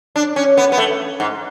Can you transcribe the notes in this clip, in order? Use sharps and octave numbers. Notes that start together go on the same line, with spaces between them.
D4
C#4
B3
B3
A3
G#2